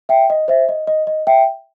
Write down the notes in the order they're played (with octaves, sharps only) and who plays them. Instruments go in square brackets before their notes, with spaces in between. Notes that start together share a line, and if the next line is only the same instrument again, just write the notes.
[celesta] E5 G5
D#5
C5 E5
D#5
D#5
D#5
E5 G5